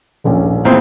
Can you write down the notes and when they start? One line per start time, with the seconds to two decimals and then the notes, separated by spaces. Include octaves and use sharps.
0.24 D#1 A#1 C#4
0.65 E2 A#2 C4